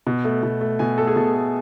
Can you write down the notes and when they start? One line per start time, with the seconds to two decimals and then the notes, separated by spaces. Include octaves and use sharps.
0.07 B2
0.25 A3
0.43 B2
0.61 A3
0.79 B2 G#5
0.98 A3 A4
1.07 G#4
1.16 B2 A4
1.34 A3